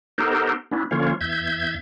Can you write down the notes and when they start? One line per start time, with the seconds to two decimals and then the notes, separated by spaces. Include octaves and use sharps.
0.18 B3 D#4 G4 A4 A#4 C5
0.71 B3 C#4 D4 E4
0.91 D3 F3 A#3 C#4 F4 C#5
1.21 E2 E5 G6 G#6